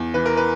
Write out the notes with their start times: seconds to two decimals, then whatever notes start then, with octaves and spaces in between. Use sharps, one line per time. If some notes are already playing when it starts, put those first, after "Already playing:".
Already playing: E2
0.14 E3 B4
0.26 A#4
0.37 B4